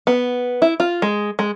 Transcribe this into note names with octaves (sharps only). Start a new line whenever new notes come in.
B3
E4
F4
G#3
G#3